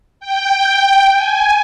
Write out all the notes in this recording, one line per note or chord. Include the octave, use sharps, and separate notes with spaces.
G5
G#5